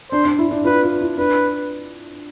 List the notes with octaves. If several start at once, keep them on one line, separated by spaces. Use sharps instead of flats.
D4 C5
D4
E4
D4
F4 B4
F4
E4
D4 B4